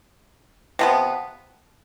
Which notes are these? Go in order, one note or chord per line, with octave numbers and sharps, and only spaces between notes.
C3 F3 B3